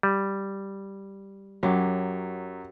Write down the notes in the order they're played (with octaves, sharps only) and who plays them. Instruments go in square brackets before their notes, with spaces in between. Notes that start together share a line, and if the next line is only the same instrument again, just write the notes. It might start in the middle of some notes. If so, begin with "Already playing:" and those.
[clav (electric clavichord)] G3
[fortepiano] F#2 [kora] F#3 G4